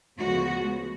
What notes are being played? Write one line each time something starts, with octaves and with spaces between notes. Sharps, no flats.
D2 C#3 F3 G#3 B3 F#4